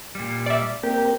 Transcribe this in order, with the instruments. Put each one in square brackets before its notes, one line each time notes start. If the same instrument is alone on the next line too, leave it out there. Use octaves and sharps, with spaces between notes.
[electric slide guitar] A#2 G3
[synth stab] D5 E5
[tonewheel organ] A#3 C4 A#4 [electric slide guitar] G4